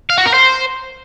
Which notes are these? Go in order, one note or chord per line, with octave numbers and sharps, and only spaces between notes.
F5
F#4
A#4
C5